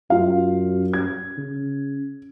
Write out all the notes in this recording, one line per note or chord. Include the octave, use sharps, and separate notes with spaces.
F#2 F4 F5
G#6
C#3